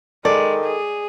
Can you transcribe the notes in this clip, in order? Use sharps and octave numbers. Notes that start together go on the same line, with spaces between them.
D#3 G#3 A4 D5
G#4